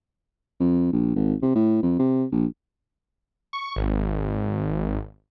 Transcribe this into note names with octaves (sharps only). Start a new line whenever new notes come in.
F2
A#1
G#1
C3
A2
F2
C3
A#1
C#6
G#1